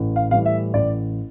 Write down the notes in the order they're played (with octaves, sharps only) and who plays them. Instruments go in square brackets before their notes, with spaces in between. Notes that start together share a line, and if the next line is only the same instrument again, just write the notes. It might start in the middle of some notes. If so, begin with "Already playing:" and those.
Already playing: [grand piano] A1
F5
A2 E3 G3 F5
E5
A1 D5